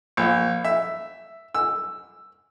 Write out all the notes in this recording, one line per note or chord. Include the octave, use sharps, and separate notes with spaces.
A#1
E5
E6